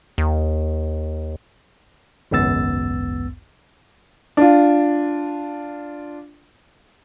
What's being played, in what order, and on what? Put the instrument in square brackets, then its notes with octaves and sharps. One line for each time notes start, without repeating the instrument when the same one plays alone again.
[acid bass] D#2
[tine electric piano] G#1 C#2 F#2 B3 E6 A6
[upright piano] D4 F4